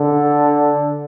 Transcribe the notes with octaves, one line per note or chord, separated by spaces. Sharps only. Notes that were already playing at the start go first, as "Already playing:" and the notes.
Already playing: D3